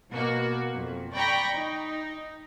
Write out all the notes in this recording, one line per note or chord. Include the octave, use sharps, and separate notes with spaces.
B2 A#3 F#4
F2
D5 G5 A#5 B5 C#6 A#6
D#4